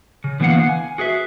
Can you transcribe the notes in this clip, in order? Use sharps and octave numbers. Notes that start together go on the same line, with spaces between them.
C#3
D3 E3 A#3 B3 F5 F#5
G#5
F#4 G#4 B4 E5